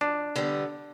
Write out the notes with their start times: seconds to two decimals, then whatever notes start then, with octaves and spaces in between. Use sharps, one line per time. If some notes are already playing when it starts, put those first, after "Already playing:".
0.01 F2 D4
0.35 D3 G3 B3